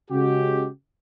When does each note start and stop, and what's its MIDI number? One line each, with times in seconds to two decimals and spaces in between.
0.11 0.66 49
0.11 0.66 56
0.11 0.66 66
0.11 0.66 67